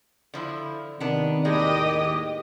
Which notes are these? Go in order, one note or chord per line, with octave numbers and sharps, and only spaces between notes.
D3 F3 E4
C3 D#3 B3 D4
D#2 A2 G#3 G4 D#5 D#6